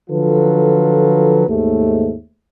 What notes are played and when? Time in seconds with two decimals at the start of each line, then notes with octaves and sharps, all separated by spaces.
0.10 D3 F3 F#3 F4 A4 B4
1.49 D#2 G#2 A3